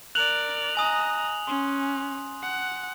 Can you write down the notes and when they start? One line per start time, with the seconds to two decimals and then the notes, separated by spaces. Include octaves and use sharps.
0.15 A#4 D5 F#6 F7 F#7
0.77 D#5 G#5 A#5 D#6
1.47 C#4 C6
2.42 F#5